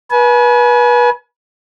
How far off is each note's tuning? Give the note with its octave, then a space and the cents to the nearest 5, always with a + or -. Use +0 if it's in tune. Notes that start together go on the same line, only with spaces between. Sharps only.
B4 -30 G#5 +35